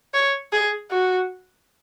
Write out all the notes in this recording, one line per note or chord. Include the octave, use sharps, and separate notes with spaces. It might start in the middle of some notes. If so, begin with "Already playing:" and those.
C#5
G#4
F#4